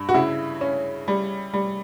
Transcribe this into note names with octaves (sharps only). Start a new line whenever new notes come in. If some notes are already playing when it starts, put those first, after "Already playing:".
Already playing: G2
F#4
C#3 E4
C#4
G3
G3